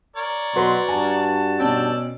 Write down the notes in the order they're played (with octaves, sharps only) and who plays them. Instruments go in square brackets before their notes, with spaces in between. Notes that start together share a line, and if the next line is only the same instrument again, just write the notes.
[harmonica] A#4 C#5 D5
[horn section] B2 F#3 C6 [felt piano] F#4 B4 A#5
[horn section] G2 F#4 A5 [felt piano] G#5
[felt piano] B2 C#4 [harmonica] D5 G5 E6